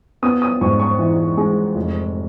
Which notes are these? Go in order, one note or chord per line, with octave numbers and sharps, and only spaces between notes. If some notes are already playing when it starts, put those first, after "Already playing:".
B3 D#6
D#6
G#2 C#6
C#6
E3
G#3
F1